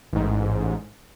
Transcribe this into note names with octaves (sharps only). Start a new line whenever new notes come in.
A1 G#2